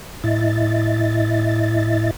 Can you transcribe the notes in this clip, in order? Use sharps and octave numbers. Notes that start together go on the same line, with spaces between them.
A2 E4 D#5 E5 A6